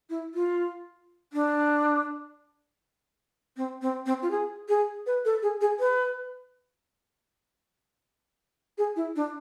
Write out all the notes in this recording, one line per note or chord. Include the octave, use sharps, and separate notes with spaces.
E4
F4
D4
C4
C4
C4
F4
G#4
G#4
B4
A4
G#4
G#4
B4
G#4
E4
D4